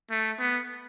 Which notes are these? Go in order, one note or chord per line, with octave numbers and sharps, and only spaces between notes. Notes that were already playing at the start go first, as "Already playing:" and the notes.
A3
B3